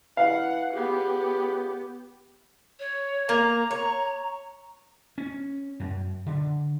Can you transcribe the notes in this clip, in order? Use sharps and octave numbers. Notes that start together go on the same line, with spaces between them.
E3 F5 F#5
C#2 B3 G4
C#5
A#3 A#5
C#5
C#4
F#2
D3